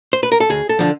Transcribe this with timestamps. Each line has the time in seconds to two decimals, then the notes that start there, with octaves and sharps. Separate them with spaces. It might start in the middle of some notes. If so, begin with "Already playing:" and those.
0.13 C5
0.23 B4
0.32 A#4
0.40 A4
0.49 D2 G#4
0.69 A4
0.79 D3 F3